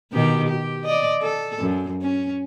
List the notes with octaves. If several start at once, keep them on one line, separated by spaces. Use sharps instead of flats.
B2 D#3 G4
G4
D5 D#5
A4
F#2
C#4